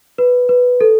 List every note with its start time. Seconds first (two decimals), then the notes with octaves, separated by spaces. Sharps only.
0.18 B4
0.49 B4
0.81 A4